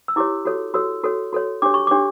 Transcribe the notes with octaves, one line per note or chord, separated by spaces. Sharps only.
E6
E4 G4 C#5 D6
F#4 A4 C#5
F#4 A4 C#5 E6
F#4 A4 C#5
F#4 A4 C#5
D4 G4 C#5 D6
C#6
D4 G4 C#5 D6